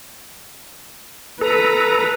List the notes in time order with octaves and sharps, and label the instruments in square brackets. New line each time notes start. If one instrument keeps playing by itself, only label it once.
[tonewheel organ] A4 A#5 [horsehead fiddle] B4